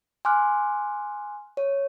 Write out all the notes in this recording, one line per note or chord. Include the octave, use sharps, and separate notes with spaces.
G#5 C6 D6 F6 F#6
C#5